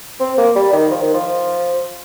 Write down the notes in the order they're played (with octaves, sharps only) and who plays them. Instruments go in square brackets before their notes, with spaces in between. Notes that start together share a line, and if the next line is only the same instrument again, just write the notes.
[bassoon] C4
A#3
G3
D#3
F3
D#3
F3